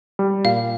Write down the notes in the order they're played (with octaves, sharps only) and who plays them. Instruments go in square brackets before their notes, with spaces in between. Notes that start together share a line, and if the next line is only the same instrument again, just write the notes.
[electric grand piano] G3
[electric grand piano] A#2 [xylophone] F5